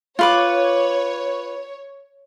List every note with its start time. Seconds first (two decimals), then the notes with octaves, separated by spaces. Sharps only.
0.19 F4 B4 C#5 D6